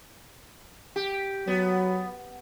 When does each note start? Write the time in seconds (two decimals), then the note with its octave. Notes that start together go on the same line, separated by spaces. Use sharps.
0.96 G4
1.47 F#3 B3